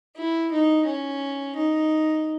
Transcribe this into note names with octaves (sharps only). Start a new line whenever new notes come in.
E4
D#4
C#4
D#4